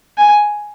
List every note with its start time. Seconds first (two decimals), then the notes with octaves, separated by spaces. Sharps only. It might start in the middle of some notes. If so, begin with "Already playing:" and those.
0.18 G#5